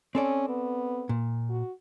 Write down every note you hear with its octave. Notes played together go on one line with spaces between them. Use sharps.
C4 C#4 A4 D5
B3
A#2
F#4